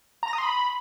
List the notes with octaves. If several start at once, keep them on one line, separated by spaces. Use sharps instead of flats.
A#5
A#6
D#6
C6
B5